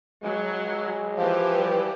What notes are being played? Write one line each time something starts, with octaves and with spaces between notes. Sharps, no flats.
F#3 G#3
E3 F3 G4
G3